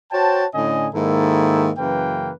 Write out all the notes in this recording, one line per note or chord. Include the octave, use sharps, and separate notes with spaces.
F#4 C5 C#5 G5 A5
A2 D3 C#4 D#5 G#5
G#2 D#3 A#3 E4 A4
F#2 C#3 E3 A#3 B4 G5